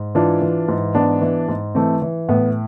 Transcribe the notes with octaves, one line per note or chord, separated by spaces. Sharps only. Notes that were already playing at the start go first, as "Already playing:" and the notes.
Already playing: G#2
E3 D4 F4
E3
G#2
E3 B3 D4
E3
G#2
E3 A3 C4
E3
A2 B3